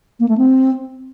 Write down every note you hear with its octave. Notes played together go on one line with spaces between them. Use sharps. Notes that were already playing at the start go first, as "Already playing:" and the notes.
A#3
A3
C4